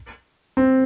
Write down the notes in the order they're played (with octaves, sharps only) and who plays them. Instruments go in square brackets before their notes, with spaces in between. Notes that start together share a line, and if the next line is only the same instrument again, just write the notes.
[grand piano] C4